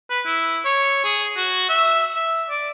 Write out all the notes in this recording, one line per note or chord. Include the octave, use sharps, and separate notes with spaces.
B4
E4
C#5
G#4
F#4
E5
E5
D5